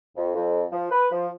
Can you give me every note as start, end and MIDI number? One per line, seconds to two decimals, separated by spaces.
0.17 0.31 41
0.35 0.63 41
0.72 0.86 53
0.90 1.06 71
1.12 1.28 53